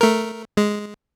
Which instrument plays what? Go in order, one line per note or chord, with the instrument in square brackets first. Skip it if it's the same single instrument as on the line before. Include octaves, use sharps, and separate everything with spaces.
[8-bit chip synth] A3 A#4
G#3